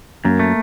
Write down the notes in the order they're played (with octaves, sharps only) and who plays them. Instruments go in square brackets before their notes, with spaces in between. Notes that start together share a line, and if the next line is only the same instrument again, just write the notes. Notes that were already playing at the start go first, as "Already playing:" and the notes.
[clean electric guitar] F#2 [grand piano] A#3
[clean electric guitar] A3